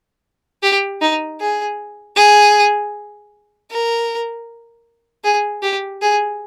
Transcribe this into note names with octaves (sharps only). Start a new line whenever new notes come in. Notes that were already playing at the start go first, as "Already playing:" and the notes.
G4
D#4
G#4
G#4
A#4
G#4
G4
G#4